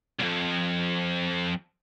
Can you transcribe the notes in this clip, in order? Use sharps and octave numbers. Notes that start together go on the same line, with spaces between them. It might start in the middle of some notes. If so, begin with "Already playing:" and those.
C2 F2